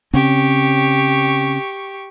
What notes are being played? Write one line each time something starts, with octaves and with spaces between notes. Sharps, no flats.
C#3 C4 C#4 G4 C#6